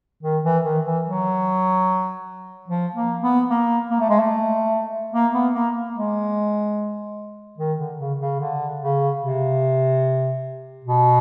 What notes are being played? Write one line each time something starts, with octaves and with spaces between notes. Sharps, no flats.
D#3
E3
D#3
E3
F#3
F3
A#3
B3
A#3
A#3
A3
G#3
A3
A#3
B3
A#3
G#3
D#3
D3
C#3
C#3
D3
C#3
C3
B2